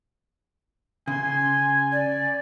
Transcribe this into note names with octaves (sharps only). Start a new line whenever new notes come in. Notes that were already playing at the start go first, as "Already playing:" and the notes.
C#3 G#5 C6
D5